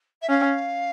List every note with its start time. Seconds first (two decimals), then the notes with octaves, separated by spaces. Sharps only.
0.22 E5
0.29 C#4 F5